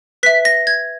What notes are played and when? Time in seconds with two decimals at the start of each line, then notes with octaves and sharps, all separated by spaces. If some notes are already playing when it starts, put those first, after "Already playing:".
0.23 B4 E5 B6
0.45 A#6
0.67 G#6